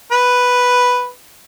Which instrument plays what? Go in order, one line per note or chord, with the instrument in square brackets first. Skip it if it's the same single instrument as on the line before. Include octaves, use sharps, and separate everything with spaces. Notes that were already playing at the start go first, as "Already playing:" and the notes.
[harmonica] B4